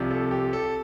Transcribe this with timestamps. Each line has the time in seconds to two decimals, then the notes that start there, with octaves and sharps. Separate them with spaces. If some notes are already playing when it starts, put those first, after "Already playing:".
Already playing: C2 C3 F3
0.11 A4
0.31 G4
0.53 A4